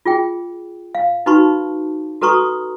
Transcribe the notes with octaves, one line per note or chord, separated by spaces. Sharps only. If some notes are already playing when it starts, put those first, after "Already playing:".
F4 G#4 G5
F5
D#4 F#4 B4 A5 B5 C#6
F#4 A4 B4 A#5 C#6 D#6